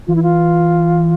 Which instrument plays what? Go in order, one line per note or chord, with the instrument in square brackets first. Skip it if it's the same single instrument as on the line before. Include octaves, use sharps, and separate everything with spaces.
[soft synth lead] E3 [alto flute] F4
[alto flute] E4
F4